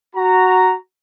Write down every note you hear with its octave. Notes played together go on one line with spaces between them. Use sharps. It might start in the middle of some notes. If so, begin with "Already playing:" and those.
F#4 A#5